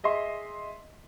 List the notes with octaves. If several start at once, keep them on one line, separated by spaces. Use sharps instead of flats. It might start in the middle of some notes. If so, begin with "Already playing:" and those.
G#4 D#5 E5 C6